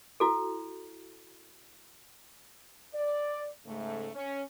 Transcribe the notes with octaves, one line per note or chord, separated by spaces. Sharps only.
E4 F#4 A4
D5
G#2 C#3 A3
C#4